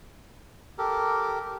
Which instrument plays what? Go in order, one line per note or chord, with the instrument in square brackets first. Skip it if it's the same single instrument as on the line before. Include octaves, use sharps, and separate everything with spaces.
[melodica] G4 A4 A#4